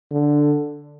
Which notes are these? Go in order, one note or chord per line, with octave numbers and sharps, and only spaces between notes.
D3